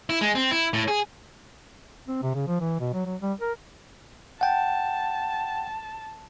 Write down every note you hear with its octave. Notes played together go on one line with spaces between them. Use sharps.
E4
G#3
C4
E4
A2
G#4
C4
C3
C#3
F3
E3
B2
F#3
F#3
G3
A#4
F#5 G5 A5